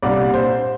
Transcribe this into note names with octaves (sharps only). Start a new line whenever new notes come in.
C2 A#2 G3 D4 D5
C5